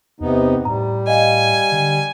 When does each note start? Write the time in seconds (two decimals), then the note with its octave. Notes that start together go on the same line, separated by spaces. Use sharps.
0.20 E2 C3 B3 D#4
0.65 A2 G3 A#5
1.07 D#5 F5 G#5
1.72 D3